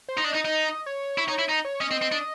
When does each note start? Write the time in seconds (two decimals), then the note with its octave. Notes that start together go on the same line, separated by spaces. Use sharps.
0.09 C5
0.17 D#4
0.24 D4 D#5
0.34 D#4
0.45 D#4
0.86 C#5
1.18 E4
1.28 D#4
1.39 E4
1.49 D#4
1.65 C#5
1.80 C#4 D#5
1.91 C4
2.02 C4
2.12 D4